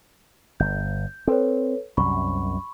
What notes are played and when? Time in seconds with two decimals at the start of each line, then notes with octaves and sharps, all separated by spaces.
0.60 G1 G6
1.27 C4 A4 B4 C#5
1.97 C2 F#2 B5 C#6